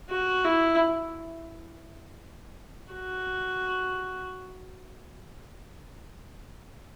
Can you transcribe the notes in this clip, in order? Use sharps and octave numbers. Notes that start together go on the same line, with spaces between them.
F#4
E4
F#4